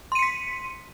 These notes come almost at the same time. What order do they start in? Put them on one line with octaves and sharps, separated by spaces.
C6 D#7 C#7 B6